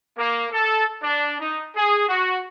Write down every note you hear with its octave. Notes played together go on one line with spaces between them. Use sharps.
A#3
A4
D4
D#4
G#4
F#4